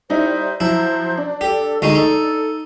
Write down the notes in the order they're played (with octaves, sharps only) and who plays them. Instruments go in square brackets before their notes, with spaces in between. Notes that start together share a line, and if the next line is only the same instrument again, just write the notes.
[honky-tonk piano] G3 D#4 E4 [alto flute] C5
[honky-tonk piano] F3 F#3 [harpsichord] E4 [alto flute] C5
[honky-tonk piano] D4
[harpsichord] G4 [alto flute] A4
[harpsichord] D2 G#3 D#4 [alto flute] C#6
[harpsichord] D#4 [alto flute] A4